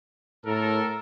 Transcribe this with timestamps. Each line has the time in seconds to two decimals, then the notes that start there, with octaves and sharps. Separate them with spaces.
0.46 A2 A4 A#4